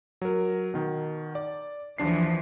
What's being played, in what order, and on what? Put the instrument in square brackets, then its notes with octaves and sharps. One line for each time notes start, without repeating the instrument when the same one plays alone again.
[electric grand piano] F#3 A#4
B2 D#3
D5
[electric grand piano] D#2 D4 C7 [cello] E3 F3